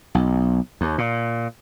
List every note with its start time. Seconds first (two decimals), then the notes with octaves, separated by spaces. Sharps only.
0.15 B1
0.81 D#2
0.98 A#2